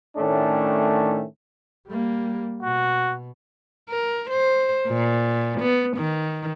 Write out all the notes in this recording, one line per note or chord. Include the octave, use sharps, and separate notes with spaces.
A2 D#3 A3 C#4 D4
G3 A#3
B2 F#4
A#4
C5
A#2
B3
D#3